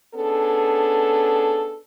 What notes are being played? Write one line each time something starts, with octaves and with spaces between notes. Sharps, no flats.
B3 C#4 D4 G#4 A4